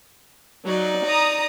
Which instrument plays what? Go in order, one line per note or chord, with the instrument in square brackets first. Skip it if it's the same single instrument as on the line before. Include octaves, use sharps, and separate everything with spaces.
[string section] F#3 [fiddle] D#4 D5
[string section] A#5 D#6